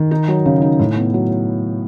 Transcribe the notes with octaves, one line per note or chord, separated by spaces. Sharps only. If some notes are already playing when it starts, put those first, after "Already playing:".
Already playing: D#3
D#4
F#3
C#3
D#4
A2
B3
F#3